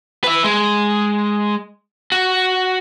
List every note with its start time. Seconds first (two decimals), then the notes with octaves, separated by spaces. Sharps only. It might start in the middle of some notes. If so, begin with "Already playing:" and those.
0.24 B4 E5
0.44 G#3
2.12 F#4